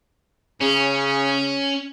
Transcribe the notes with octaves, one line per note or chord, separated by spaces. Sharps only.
C#3 C#4